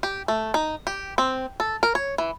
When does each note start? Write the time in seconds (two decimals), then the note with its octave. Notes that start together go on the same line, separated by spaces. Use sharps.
0.03 G4
0.28 A3
0.54 D#4
0.87 G4
1.18 C4
1.60 A4
1.83 A#4
1.95 C#5
2.18 E3